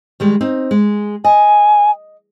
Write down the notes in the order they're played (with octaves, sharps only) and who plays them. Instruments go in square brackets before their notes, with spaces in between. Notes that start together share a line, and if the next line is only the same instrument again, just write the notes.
[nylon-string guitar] D#3 G3 G#3
C4 D#4
G#3
[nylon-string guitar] D#5 [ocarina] G#5